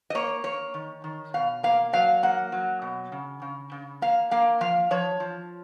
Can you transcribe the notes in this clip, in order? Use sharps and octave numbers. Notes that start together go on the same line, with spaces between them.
D#5
A#3 C#5
A#3 C#5
D#3
D#3
B2 F5
A#3 F5
F#3 F5
A#3 F#5
F#3
B2
C#3
C#3
C#3
A#3 F5
A#3 F5
F3 F5
F3 C#5
F3